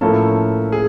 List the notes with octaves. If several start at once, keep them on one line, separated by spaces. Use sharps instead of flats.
A2 F3 A#3 C#4 A4
G#4